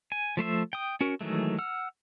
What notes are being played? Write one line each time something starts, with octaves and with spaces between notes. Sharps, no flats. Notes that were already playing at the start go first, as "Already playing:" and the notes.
G#5
F3 A3 C5 E5
G5 D#6
C#4 F#4 A#4
D#3 E3 F#3 G#3 A3
F#5 E6 F6